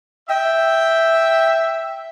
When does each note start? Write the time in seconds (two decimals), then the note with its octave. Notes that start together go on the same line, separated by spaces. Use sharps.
0.29 E5 G5